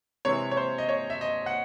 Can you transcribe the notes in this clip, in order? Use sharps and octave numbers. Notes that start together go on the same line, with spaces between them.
C3 E3 G#3 C4 E4 C#5
C#5
C5
D#5
C#5
E5
D#5
F#5